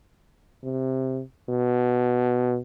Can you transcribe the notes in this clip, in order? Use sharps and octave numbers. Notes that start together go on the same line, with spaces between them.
C3
B2